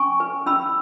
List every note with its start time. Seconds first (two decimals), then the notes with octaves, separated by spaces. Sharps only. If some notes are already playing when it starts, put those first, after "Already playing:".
Already playing: C#4 G#5 C#6
0.20 B4
0.46 C#4 B5 E6